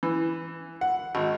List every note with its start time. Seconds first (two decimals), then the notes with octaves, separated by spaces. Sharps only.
0.03 E3
0.81 F#5
1.15 G#1